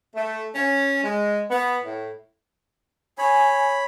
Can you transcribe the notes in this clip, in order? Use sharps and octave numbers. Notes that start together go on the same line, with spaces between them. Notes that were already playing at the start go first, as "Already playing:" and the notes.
A3
C#4
G#3
B3
A2
C#5 G#5 B5